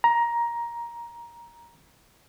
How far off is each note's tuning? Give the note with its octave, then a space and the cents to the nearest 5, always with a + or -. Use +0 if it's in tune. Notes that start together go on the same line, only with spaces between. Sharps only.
A#5 +15